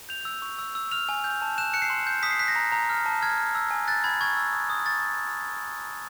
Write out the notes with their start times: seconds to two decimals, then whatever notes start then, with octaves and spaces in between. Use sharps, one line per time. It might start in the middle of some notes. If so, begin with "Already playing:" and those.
0.09 G6 F7
0.25 E6
0.42 C#6
0.59 E6
0.75 E6
0.92 F6 F7
1.09 G#5
1.24 G6
1.42 A5
1.58 F#6 E7
1.74 F#6 C#7
1.82 C7
1.90 C6
2.07 G6
2.23 D#6 B6
2.31 C7
2.39 F#6 B6
2.48 A#6
2.56 A#5
2.72 A#5
2.90 F6
3.06 A5
3.23 F6 G#6
3.38 F6
3.55 E6
3.71 G#5
3.88 F#6 A6
4.04 B5 G#6
4.21 C#6 G#6
4.37 E6
4.53 D#6
4.70 D#6
4.86 C#6 A6